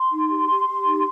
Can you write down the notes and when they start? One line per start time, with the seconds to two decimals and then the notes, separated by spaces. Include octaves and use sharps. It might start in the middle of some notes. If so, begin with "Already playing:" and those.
Already playing: C6
0.11 D#4
0.30 G4
0.48 G4
0.67 G4
0.86 D#4